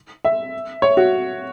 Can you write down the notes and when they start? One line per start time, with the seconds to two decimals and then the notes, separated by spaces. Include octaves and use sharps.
0.25 E5
0.82 C#5
0.97 F#4